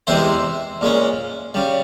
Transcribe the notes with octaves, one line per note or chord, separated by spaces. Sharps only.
E2 C3 E3 G#3 C5 E5
A#2 G#3 C#4
C#3 G3